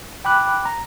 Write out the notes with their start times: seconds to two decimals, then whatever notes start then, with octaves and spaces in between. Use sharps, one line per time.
0.25 G5 B5 D6 F#6
0.65 A#5